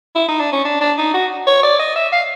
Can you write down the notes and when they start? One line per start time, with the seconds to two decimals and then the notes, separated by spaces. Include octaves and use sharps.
0.15 E4
0.28 D#4
0.40 D4
0.52 C#4
0.65 D4
0.81 D4
0.98 D#4
1.14 F#4
1.47 C#5
1.63 D5
1.79 D#5
1.95 E5
2.12 F5